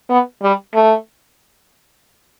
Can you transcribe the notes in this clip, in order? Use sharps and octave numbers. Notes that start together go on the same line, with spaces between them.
B3
G3
A3